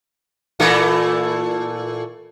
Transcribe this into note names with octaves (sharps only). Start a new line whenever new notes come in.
A#2 E3 A3